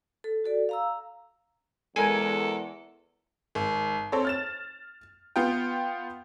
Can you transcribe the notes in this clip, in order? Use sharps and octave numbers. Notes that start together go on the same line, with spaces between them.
A4
F#4 A4 D5
F5 A#5 E6
E2 G#3 A4 A#4 G#5
G#1
C4 A4 C#5
F6 A6 E7
B3 F4 G5